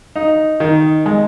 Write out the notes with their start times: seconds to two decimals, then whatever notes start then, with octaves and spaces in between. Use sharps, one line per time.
0.16 D#4
0.60 D#3
1.06 G#3